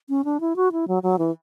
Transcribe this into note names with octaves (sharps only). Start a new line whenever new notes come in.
C#4
D4
E4
F#4
E4
F#3
F#3
E3